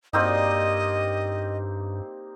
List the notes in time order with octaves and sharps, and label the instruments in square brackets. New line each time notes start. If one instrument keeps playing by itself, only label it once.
[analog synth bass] G2 [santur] A#3 C4 D#4 [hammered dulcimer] G4 D5 [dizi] D#5